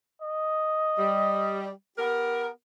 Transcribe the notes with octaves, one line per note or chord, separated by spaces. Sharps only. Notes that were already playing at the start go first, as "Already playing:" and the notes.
D#5
G3
B3 G4 A#4